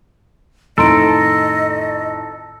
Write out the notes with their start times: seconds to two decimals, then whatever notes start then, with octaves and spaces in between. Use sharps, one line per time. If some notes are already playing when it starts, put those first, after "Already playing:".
0.78 F2 A2 D#3 A4 D#5 A#5 C6 D7